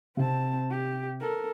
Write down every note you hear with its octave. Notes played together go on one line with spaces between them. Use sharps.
C3 C4 A5
G4
A4 A#4